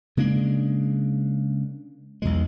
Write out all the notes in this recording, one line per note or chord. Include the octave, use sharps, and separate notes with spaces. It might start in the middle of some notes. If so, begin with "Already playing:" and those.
C#3 G#3 A#3 D4
B1 E2 B2 G#3